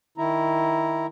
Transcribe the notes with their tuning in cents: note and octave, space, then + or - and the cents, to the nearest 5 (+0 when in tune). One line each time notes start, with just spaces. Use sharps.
D#3 +0 E4 +0 A#5 +0